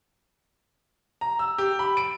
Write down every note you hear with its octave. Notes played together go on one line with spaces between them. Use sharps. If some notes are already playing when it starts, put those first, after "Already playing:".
A#5
E6
G4
B5
D7